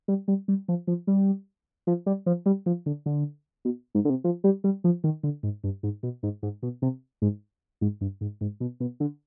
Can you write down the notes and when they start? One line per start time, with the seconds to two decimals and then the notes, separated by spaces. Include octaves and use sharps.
0.08 G3
0.28 G3
0.48 G3
0.68 F3
0.87 F3
1.07 G3
1.87 F3
2.06 G3
2.26 F3
2.46 G3
2.66 F3
2.86 D3
3.06 D3
3.65 B2
3.95 G#2
4.05 D3
4.10 C3
4.24 F3
4.44 G3
4.64 G3
4.84 F3
5.04 D#3
5.23 D3
5.43 G#2
5.64 G2
5.83 G#2
6.03 B2
6.23 G#2
6.43 G#2
6.63 B2
6.82 C3
7.22 G#2
7.81 G#2
8.01 G2
8.21 G#2
8.41 G#2
8.60 B2
8.80 B2
9.00 D3